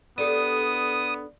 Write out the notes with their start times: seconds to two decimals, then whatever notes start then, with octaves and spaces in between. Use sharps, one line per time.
0.18 B3 D4 G4 A4 D#6